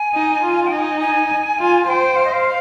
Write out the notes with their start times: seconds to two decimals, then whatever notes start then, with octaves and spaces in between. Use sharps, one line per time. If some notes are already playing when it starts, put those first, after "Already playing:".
Already playing: G#5
0.14 D#4
0.43 F4
0.65 G5
0.71 D#4 G#5
1.01 G#5
1.59 F4
1.87 C5 G5
2.16 F5
2.25 D#5
2.33 F5